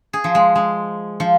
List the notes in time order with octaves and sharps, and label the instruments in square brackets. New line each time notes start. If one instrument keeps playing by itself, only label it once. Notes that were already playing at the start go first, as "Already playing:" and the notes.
[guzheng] G#4
F3
G#3
G#3
F3